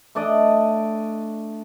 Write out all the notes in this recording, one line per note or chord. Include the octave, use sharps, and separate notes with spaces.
A3 D4 D5 D#5